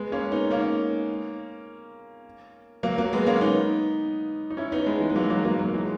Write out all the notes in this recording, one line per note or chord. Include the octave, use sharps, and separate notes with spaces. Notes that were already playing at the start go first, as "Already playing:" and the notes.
Already playing: G#3 B3
A#3 C#4
B3 D#4
A#3 C#4
F#3 A#3
F#3 A#3
G#3 B3
A#3 C#4
B3 D#4
D#4
C#4 E4
B3 D#4
G#3 B3
E3 G#3
B3
F#3 A#3
F#3 A#3
F#3 A#3
F#3 A#3
E3 G#3